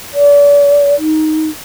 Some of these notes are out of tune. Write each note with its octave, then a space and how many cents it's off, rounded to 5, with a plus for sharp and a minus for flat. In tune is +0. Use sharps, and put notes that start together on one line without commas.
D5 -40
D#4 +10